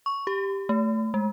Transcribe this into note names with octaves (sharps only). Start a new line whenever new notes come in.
C#6
G4
A3
G#3